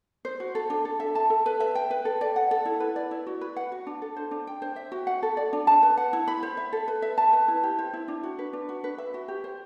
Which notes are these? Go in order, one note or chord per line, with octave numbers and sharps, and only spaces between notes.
C5
F#4
A4
D4
A4
E5
A5
A4
B4
E5
G5
B4
A4
D5
F#5
A4
E4
B4
D5
E4
F#4
B4
F#5
F#4
D4
A4
C5
D4
G5
C5
E5
F#4
F#5
A4
D5
D4
A5
B4
F#5
E4
B5
C5
E5
A4
B4
E5
A5
B4
E4
G4
C5
E4
D4
F#4
B4
D4
F#4
B4
E5
F#4
G4
C5